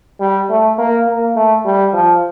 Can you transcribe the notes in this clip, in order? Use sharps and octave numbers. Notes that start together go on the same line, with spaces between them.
G3
A3
A#3
A#3
A3
G3
F3